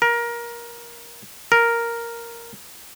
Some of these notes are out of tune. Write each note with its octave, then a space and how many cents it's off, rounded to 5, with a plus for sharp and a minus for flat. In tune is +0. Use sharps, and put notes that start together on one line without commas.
A#4 +20
A#4 +0